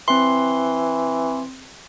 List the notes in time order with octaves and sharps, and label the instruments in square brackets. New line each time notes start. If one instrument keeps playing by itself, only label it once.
[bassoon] E3 [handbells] C4 C6